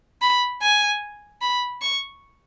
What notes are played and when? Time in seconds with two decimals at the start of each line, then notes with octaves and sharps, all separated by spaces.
0.22 B5
0.62 G#5
1.42 B5
1.82 C#6